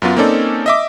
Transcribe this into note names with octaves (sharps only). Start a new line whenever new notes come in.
F#2 F#3 B3 F4
A#3 C4 C#4 D#4 A4 D5
D#5 E5 D6